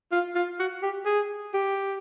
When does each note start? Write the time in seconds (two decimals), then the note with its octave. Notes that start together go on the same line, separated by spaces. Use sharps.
0.12 F4
0.35 F4
0.59 F#4
0.83 G4
1.06 G#4
1.54 G4